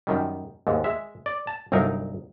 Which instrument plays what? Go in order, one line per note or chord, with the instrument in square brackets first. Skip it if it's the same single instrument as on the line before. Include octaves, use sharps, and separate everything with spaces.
[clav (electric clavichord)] F#2 D#3 G3
D#2 G#2
G#3 E5
D5
A5
G1 C2 F#3 D#4 A#4